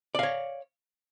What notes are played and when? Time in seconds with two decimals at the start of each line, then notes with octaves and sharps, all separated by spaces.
0.15 D5
0.19 F5
0.23 C#5